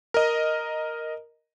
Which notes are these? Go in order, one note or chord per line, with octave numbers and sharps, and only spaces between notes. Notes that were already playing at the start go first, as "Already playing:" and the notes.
A#4 D#5